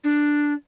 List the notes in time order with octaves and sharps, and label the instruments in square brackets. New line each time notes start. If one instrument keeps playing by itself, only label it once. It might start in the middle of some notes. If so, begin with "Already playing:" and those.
[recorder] D4